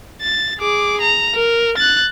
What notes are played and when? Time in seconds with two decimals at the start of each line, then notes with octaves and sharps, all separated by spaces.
0.22 A6
0.60 G#4 D6
1.01 A#5
1.35 A#4
1.78 F#6 A6